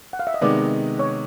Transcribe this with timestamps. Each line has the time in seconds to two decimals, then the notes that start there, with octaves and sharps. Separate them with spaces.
0.13 F#5
0.19 F5
0.27 E5
0.34 D#5
0.41 C3 D#3 G#3 B3 D#4 D5
0.99 C#5